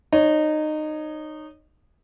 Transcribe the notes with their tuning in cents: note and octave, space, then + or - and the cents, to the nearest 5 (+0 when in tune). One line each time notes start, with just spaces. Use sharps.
D#4 -20 C#5 +0